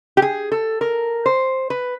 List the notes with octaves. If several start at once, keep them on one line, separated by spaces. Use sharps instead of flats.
G4
G#4
A4
A#4
C5
B4